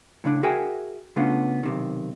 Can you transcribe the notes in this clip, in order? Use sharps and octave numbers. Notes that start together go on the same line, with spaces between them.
A2 C#3 C4 D4
F#4 G#4 A#4 E5 G5 G#5
C#3 A3 B3 C#4 D4 F4
B1 C3 D#3